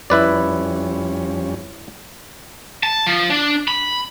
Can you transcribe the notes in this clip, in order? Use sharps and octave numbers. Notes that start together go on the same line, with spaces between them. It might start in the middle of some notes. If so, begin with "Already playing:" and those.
F2 G3 C#4 E4 B4 D5
A5
F3
D4
B5